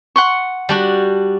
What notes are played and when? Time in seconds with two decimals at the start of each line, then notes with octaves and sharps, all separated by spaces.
0.16 F#5 C6 C#6
0.69 G3 D4 F#4